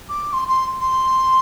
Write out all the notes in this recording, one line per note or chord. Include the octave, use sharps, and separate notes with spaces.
D6
C6
C6
C6